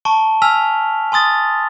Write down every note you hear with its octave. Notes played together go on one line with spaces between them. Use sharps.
A5 A#5 C#6 D7 G7
G#5 E6 F6 B6 F7
G#5 C6 D#6 A6 G7